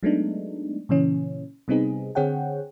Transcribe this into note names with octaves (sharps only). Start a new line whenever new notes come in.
F#3 G#3 A3 B3 D4 D#4
A#2 C#3 E3 C#4
C3 G3 B3 C4 D#4 G#4
D3 C4 G#4 C#5 F#5 G5